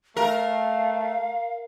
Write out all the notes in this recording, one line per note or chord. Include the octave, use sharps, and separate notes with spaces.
A3 A#4 F5